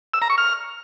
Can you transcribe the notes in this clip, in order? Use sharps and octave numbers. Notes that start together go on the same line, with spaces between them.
E6
A#5
C#6
F6